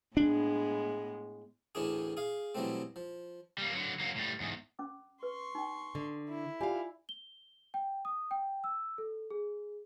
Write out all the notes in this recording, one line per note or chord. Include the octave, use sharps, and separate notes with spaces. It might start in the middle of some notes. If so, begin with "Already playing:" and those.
A2 G#3 B3 D4
A1 D2 E3 C#4 D4 G#4
G#4 F5
B2 E3 F#3 G3 A3 C4
F3
G3 A#3
D3 F#3
F#3 A#3
A2 G3
E2 G#2
C#4 D6
B4 C6 C#6
D#4 G5
D3
E4
F4 G4 D5 F5 G#5
G7
G5
D#6
G5
E6
A4
G#4